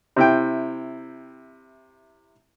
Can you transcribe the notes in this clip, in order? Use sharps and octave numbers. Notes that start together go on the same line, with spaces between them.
C3 E4 G5